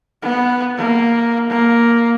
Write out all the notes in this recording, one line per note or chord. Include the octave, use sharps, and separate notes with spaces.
B3
A#3
A#3